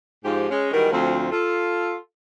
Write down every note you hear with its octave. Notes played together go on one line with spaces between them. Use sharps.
G#2 F3 G4
G#3 C#4
D#3 E3 G3 G#3 F#4 A#4
D2 F3 C4
F4 A4